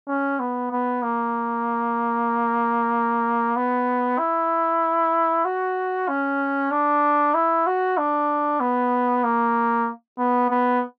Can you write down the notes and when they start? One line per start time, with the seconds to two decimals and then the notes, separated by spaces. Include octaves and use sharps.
0.08 C#4
0.40 B3
0.71 B3
1.03 A#3
3.56 B3
4.19 E4
5.45 F#4
6.08 C#4
6.71 D4
7.34 E4
7.67 F#4
7.98 D4
8.60 B3
9.24 A#3
10.18 B3
10.51 B3